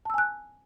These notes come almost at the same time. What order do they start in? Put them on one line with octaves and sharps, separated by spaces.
A5 E6 G#5 F#6